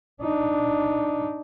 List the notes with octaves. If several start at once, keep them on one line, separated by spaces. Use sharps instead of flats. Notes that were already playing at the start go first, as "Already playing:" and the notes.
D4 D#4